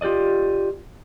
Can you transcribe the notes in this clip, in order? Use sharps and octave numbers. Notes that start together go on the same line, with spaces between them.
F4 G4 A#4 D5 D#5